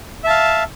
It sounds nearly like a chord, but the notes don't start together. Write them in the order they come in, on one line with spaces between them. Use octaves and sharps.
E5 A5 F5